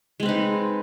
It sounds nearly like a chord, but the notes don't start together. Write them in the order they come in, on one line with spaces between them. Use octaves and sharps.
G#3 C4 B4 D#4